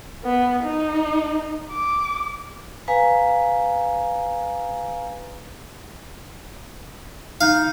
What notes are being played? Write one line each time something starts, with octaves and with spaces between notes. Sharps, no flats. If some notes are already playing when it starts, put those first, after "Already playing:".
B3
D#4
D6
B4 F5 G#5 A#5
D#4 F5